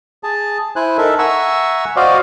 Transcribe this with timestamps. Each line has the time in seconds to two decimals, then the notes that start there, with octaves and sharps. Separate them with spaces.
0.23 G#4 A5
0.76 E4 C5 G#5 F#6
0.98 D#4 A4 A#4 E5
1.19 E5 F#5 G#5 A#5 C#6 E6
1.96 F#4 C5 D5 D#5 F5